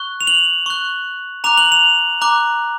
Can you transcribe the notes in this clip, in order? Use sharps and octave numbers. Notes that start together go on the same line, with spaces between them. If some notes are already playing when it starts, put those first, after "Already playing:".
Already playing: C#6 F#6 G7
F7
F#7
C#6 F#6
A#5 D6 F#6 F7
F#7
F7
A#5 D6 F#6